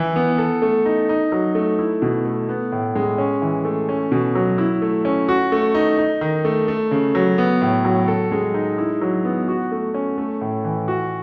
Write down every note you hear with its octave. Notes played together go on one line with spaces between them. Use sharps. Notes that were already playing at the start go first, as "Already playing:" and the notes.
Already playing: E3 E4
B3
A4
A3
D#4
D#4
F#3
A3
E4
B2
A3
B3
A2
G#3
C#4
E3
A3
C#4
B2
F#3
E4
A3
C#4
F#4
A3
D#4
D#4
D#3
A3
A3
C#3
F#3
B3
A2
F#3
A4
G#3
D#4
E4
F#3
B3
F#4
A3
C#4
A3
A2
E3
F#4